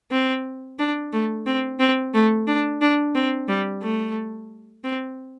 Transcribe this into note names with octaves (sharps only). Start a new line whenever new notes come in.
C4
D4
A3
C4
C4
A3
D4
D4
C4
G3
A3
C4